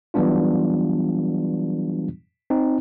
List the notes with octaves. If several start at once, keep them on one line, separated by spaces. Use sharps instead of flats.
E3 F#3 G3 B3 D4 F4
C4 D#4